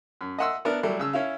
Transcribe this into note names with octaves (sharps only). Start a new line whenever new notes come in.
F#2
D#5 E5 F#5 C6 E6
B3 D4 E4 A#4
F#3 G3 A3 E4
C#3 E6
C#4 E4 F5